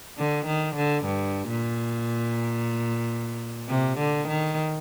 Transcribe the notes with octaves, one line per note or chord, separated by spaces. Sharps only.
D3
D#3
D3
G2
A#2
C3
D3
D#3